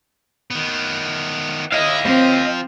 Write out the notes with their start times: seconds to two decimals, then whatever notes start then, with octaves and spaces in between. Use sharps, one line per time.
0.51 D#3 B3
1.72 E4 D#5 F5
2.05 F3 C4